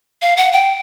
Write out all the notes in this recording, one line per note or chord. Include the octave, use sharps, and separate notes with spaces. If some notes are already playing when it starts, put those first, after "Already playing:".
F5
F#5
G5